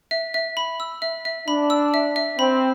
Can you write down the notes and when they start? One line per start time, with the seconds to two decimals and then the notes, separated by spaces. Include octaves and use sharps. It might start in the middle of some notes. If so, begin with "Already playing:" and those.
0.11 E5
0.34 E5
0.57 B5
0.80 E6
1.02 E5
1.25 E5
1.48 D4 B5
1.70 E6
1.94 E5
2.16 E5
2.38 C4 B5